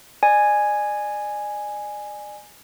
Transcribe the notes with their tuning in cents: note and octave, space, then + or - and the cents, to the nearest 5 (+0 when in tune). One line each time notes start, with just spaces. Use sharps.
D5 +40 G#5 +0